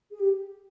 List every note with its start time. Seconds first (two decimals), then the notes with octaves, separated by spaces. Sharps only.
0.11 G#4
0.20 G4